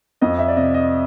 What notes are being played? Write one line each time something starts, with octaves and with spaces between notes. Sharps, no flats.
F2 D#5
E5
D5
C3 D#5
D#5